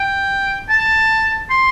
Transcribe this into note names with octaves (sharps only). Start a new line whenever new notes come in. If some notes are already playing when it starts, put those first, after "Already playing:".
Already playing: G5
A5
C6